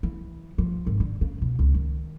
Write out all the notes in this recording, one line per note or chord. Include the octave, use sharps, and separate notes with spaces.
E3
F3
G#1
D3
C#3
B2
C#2
D#3